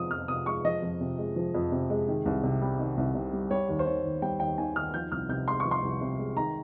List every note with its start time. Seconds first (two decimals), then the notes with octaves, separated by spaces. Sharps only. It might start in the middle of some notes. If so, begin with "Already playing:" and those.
Already playing: F2 C3 F3 G#3 D#6
0.11 F2 F6
0.28 C3 D#6
0.46 G#3 C#6
0.65 F3 D#5
0.82 F2
1.01 C3
1.18 G#3
1.36 F3
1.55 F2
1.72 C3
1.90 G#3
2.08 D#3
2.25 C2
2.43 C3
2.61 G3
2.79 D#3
2.97 C2
3.15 C3
3.33 G3
3.50 G3 C#5
3.69 D#2
3.79 C5
3.86 D#3 C#5
4.04 D#2
4.22 G3 G5
4.40 D#2 G5
4.58 D#3 G#5
4.76 D#2 F6
4.94 F3 G6
5.12 C2 F6
5.29 C3 G6
5.48 G#3 C6
5.60 C#6
5.65 F3
5.71 C6
5.83 C2
6.01 C3
6.19 G#3
6.36 D#3 A#5